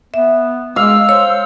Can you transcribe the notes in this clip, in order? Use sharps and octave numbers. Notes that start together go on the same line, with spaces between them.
B3 E5
G#3 F5 E6
C5 C#5